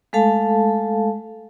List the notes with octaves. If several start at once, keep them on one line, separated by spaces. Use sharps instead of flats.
G#3 A3 A4 F5 A5